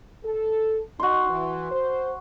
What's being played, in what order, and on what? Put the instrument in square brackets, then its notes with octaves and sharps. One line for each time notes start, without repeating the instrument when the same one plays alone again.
[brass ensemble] A4
[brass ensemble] D#4 [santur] F#4 C6
[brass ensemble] E3
C5